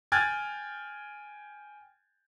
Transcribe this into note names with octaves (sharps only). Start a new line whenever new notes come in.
G5 G#5 F6 F#6 G#6 A6